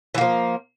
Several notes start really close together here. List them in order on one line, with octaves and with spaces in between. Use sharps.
E3 A#3 F3